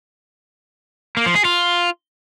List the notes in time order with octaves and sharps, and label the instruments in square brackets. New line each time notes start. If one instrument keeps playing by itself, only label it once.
[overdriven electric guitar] A#3
F3
G#4
F4